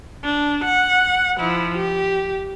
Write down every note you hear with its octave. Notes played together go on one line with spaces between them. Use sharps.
D4
F#5
F3 E4
G4